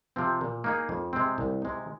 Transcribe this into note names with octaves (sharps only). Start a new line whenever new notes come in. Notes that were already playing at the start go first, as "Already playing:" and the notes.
C3 F3 C4
A#2
A#3 D#4 G#4
F2
C3 G#3 C4
C2
C3 G#3 D#4